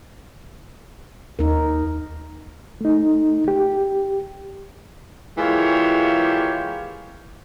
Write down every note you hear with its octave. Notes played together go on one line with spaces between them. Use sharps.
D#2 D#4 A#4
A3 D#4
G4
E3 G#3 A#3 F4 G4 C#5